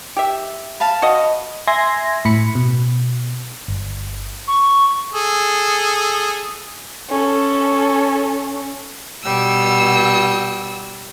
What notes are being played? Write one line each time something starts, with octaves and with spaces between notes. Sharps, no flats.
G4 E5
B4 F5 A5
F#4 D#5
E5 G#5 C6 G#6 A#6
A2 B5 C#7
B2
G1
C#6
G#4 A4
C#4 A4
B2 G3 E6